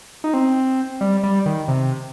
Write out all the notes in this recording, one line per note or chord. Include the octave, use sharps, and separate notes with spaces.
D#4
C4
G3
G3
D#3
C3